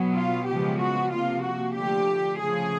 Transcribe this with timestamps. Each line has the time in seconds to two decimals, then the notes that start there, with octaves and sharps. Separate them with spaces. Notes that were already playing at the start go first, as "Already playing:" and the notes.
Already playing: B2 F#3 B3
0.16 F4
0.48 C#3 F3 G#3 B3 G4
0.80 F#4
1.12 C3 F3 A#3 F4
1.43 F#4
1.76 D3 F3 A3 G4
2.40 C#3 F3 A3 G#4